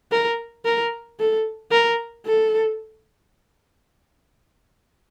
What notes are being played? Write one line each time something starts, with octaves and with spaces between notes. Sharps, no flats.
A#4
A#4
A4
A#4
A4